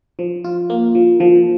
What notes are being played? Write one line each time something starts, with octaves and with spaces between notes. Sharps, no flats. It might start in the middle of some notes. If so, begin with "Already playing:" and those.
F3
F4
A#3
F3
F3